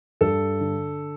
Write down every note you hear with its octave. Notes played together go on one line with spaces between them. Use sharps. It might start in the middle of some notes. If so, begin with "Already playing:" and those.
G2 A4
D3